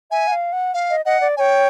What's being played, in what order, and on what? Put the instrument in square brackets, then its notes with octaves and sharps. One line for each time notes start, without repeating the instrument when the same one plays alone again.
[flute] E5 [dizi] G#5
[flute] F#5
F5
F#5
[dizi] F5
[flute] D#5
[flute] D#5 [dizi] F#5
[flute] D5
[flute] C#5 [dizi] G5 G#5